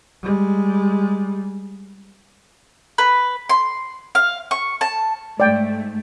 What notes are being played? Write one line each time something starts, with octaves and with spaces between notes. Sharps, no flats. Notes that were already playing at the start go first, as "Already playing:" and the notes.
G3 G#3
B4
C6
F5
C#6
A5
G#2 A3 D5 G5